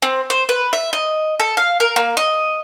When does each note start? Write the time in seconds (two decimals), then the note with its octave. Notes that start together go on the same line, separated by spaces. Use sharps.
0.02 C4
0.30 C5
0.49 B4
0.73 E5
0.93 D#5
1.40 A4
1.57 F5
1.80 A#4
1.96 A#3
2.17 D#5